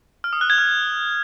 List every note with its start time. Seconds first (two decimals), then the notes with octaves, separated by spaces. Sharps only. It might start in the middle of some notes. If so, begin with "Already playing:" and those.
0.24 F6
0.33 D#6
0.41 F#6
0.50 G#6
0.58 F6